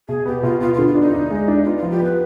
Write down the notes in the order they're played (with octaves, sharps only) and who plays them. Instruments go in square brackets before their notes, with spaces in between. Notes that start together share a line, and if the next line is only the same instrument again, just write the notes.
[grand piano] B2 [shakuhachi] G#4
[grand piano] B3 [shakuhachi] G4
[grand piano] B2 [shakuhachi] F4
[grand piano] B3 [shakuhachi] F4
[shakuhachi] F4
[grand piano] D3
[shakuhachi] F4
[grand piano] D4 [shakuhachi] D#4
[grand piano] D4
G#3
D4
[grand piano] B3 [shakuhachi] F4
[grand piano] F3 [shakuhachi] F4
[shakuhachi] G4
[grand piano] B3 [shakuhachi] B4